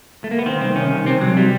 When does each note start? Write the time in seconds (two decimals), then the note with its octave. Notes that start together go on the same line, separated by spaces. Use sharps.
0.24 A3
0.31 A#3
0.39 B3
0.46 D#3 C4
0.61 C2 C4
0.76 D#3 C#4
0.91 C3
1.06 C3 C4
1.21 C2 F#3
1.37 G3